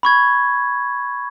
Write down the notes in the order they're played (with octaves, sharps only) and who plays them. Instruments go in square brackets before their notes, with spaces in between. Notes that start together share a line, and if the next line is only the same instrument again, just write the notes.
[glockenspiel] B5 C#6 G#6